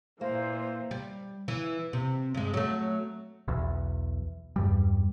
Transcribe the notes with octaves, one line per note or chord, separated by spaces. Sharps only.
A#2 E3 A#3 C5
G3
E3
C3
G2 G#3
F#3 A3
B1 E2
E2 G2 G3